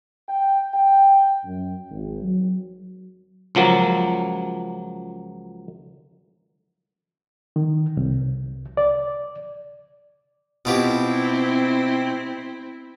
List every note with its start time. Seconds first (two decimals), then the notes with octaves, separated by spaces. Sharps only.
0.29 G5
0.74 G5
1.45 F#2
1.91 G#1
2.22 F#3
3.55 C#2 F3 F#3 A#3
7.56 D#3
7.97 C2
8.77 D5
10.65 B2 C4 E4 F4 G4